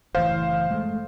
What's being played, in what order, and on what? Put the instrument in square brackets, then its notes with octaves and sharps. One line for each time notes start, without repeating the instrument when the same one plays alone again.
[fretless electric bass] F#1 A2 E3 [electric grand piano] C5 F5
[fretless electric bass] G#3 A3